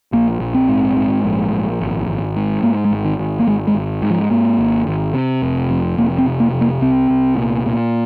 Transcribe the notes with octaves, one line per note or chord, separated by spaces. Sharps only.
A#1 A#3
A#1
C4
G#2
G#2
A#1
A#1
G#1
G#1
G#2
G#2 A#3
G#3
G#1
D#3
G#1
A#3
G#1 G#3
G#3
G#1
G#2
F3
G#2 A#3
G#1
G#1
C3
F1
F2
F1 A#3
C4
C3
A#3
F1
A#3
C2 C4
C2
A#2
A#2